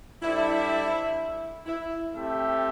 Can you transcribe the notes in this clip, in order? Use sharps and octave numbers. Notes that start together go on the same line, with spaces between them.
G3 D4 E4 A4 C5 E5
E4
A3 C4 G4 E5